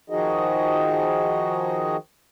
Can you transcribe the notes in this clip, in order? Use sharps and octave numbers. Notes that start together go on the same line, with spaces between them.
D#3 F3 D#4 F#4 G#4 D#5